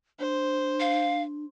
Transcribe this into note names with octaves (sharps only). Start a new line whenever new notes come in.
D4 C5
F5